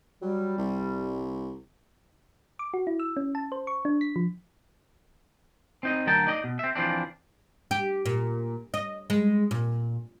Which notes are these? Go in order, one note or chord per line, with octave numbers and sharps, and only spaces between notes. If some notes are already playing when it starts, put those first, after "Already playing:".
F#3 G3
C2
D6
F#4
E4
E6
C#4
A5
C5
C#6
D4
B6
F3
C4 D#4 D#5
D2 F#3 A#4 G5 A5
D#4 D5 D#5
B2
C4 E5
E3 F3 C4 D4
G4
A#2
D#5
G#3
A#2